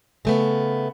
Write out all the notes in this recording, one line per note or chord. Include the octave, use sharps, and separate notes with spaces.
C#3 A3 B3